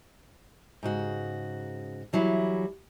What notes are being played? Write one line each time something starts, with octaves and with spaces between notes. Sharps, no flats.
G#2 C#3 F#4
E3 F#3 G3 E4